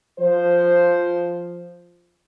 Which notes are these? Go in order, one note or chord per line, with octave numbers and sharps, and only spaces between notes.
F3 C5